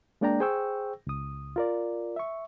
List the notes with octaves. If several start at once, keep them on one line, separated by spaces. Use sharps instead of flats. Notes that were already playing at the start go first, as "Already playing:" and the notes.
G#3 A#3 D4 D5 G5 A#5
G#4 C5 G5 C#6 E6
C#2 D#6
F4 A#4 D5
E5 C#6